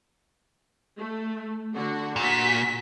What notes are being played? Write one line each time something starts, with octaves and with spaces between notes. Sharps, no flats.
A3
D3 F#4
A#2 F#4 B6